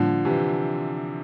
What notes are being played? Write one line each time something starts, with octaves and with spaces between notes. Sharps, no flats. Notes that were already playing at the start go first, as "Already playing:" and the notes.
Already playing: A2 D3 F3 G3 A#3 D4
C3 E3